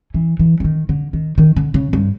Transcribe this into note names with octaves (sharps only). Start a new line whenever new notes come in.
E3
E3
E3
D#3
D3
D#3
D#3
D3
C#3
G2